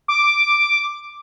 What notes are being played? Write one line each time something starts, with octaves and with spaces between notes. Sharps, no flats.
D6